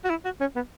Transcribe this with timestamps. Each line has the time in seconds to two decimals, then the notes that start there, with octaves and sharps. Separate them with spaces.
0.05 F#4
0.10 E4
0.25 F#4
0.40 C#4
0.56 B3